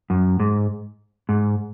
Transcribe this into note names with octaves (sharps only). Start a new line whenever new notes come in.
F#2
G#2
G#2